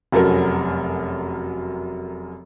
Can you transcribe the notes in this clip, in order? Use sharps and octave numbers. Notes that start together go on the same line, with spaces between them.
F1 F#2 F#3 A4 A#4